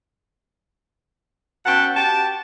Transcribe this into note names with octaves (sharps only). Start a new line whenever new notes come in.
B2 C#4 F#5 G5 A5
G4 G5 A5